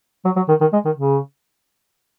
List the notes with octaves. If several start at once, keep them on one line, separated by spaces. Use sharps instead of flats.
F#3
F#3
D#3
D#3
G#3
D#3
C#3